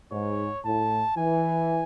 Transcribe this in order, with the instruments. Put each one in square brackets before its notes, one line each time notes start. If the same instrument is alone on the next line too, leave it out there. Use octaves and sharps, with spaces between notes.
[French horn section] G#2 [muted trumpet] C#5
[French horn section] A2 [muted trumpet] A5
[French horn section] E3 [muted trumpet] G#5